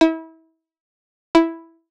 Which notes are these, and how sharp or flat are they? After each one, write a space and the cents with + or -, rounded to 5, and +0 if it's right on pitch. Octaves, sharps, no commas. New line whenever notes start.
E4 -30
E4 +0